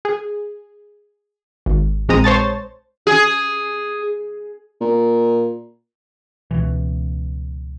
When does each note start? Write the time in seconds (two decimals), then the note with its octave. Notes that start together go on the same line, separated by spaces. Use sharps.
0.05 G#4
1.66 G#1
2.09 A#1 G#3 C4 A#5 D#6
2.24 C5 C#5 A5 A6
3.07 G#4
4.80 A#2
6.51 C#2 B2 E3